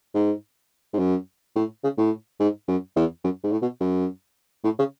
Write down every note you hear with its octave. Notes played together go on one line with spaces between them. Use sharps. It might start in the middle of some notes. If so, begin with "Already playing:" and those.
G#2
G#2
F#2
A2
C#3
A2
G#2
F#2
E2
F#2
G#2
A2
B2
F#2
A2
C#3